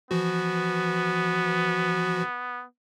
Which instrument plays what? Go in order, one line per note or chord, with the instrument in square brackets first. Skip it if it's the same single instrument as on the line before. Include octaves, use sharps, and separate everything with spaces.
[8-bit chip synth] E3 F3 F#4 [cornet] B3